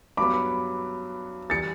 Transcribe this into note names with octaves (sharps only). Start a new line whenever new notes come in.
G2 F#3 B3 B5 D6
E3 G3 A6 C#7